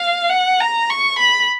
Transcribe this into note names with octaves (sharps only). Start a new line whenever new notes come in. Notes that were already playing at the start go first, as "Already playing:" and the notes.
Already playing: F5
F#5
A#5
C#6
B5